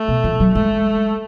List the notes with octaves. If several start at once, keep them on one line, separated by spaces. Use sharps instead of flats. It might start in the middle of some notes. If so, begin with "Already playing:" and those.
Already playing: A3
B2
F3
F#3
G#3 A3